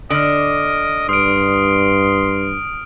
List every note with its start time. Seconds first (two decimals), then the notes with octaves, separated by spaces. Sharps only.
0.10 D3 D#5 F6 D7
1.09 G2 C6 D#6 F6 D7